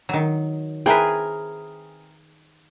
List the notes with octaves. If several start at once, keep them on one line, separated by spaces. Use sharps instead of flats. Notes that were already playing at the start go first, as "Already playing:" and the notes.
D#3 F#3
C4 E4 G#4 A#4 B4 G5